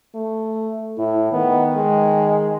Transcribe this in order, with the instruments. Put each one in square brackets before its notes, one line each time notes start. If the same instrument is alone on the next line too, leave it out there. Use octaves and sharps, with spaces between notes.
[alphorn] A3
[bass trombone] A2 [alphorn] E4
[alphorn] D#3 [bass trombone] B3
[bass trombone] G#3